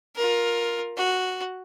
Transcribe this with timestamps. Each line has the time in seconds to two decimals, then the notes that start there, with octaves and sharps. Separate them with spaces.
0.16 F4 A#4
0.97 F#4